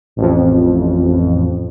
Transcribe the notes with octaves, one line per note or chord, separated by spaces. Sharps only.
A1 F2